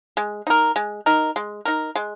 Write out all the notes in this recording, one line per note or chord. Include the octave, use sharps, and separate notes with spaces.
G#3
D#4 A#4
G#3
D#4 A#4
G#3
D#4 A#4
G#3